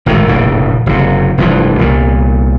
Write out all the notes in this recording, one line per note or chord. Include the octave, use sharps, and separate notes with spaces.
G#1 A2 D#3
F1 A#1 A2 C#3
F#1 C3
F1 G2 E3 F3
C2 A#2